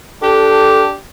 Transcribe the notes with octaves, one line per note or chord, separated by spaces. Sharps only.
D4 G4 A4